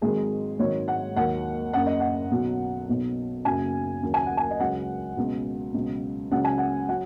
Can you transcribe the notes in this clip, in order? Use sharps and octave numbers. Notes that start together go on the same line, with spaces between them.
G#1 G#2 D#3 F#3 G#4
G#1 G#2 D#3 F#3 C#5
F#5
D#2 D#3 F#3 F#5
F#1 F#2 C#3 F#5
D#5
F#5
B1 B2 F#3
B1 B2 F#3
F#1 F#2 C#3 F#3 G#5
D#2 C#3 F#3
G#5
F#5
G#5
D#5
C#2 C#3 F#3 F#5
C#2 B2 F#3
C#2 B2 F#3
C#2 C#3 F#3 F#5
G#5
F#5
F#3 F#5